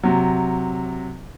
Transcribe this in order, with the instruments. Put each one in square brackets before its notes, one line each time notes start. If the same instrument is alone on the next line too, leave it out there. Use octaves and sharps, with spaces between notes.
[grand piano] C3 F#3